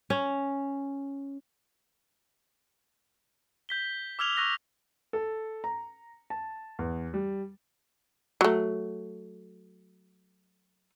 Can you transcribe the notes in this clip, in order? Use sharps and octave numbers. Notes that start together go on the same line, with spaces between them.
C#4
G6 B6 G7
D6 E6 F6 G#6 F7 G7
C#6 E6 F#6 A#6 F7
A4
A#5
A5
E2
G3
F#3 A3